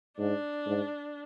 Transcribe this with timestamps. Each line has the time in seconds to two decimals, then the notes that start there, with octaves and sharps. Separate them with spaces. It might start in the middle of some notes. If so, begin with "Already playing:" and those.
0.18 G#2 D4
0.66 G#2